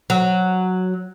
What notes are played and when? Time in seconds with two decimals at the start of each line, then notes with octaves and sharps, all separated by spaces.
0.10 F#3